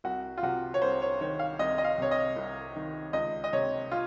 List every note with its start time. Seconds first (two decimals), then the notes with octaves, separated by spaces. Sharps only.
0.04 C2 F#4
0.38 F4
0.43 C3 F#4
0.74 C#5
0.82 C2 C5
1.02 C#5
1.21 D#3 C#5
1.39 F5
1.59 C2 D#5
1.78 D#5
1.84 F5
1.98 C3 C#5
2.11 D#5
2.36 C2
2.76 D#3
3.13 C#2 D#5
3.44 D#5
3.53 C3 C#5
3.92 F4